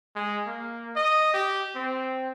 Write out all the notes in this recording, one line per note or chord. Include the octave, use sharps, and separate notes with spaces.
G#3
A#3
D#5
G4
C4